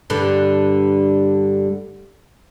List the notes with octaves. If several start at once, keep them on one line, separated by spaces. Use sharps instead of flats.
G2 D3